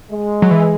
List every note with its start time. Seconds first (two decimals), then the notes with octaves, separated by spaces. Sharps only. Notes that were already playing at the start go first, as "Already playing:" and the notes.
0.11 G#3
0.42 F#3
0.51 E3